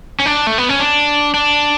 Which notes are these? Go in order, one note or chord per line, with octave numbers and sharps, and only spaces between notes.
C#4
D4
A3
B3
C#4
D4
D4